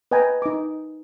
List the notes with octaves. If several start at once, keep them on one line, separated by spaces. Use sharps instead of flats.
B4 D#5 G5 G#5 A#5
D#4 D6